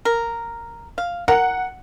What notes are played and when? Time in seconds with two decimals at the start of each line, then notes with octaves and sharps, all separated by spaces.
0.05 A#4
0.98 F5
1.28 A#4 F#5